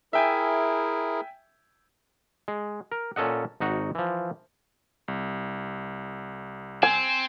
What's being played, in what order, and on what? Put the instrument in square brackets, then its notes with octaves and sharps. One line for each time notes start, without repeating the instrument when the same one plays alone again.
[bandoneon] E4 G#4 A#4 [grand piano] E5 G5 G#5
[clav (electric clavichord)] G#3
A#4
A#2 C#4 A4 D#5 F#5
G#1 D#4 F#4 F#5
E3 F3
[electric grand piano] C2
[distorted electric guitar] C4 [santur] G#5